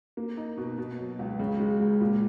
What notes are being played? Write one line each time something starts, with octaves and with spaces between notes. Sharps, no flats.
A#3
D#4
B2
B2
F#3
C#2
C#3
G#3
C#2
A#2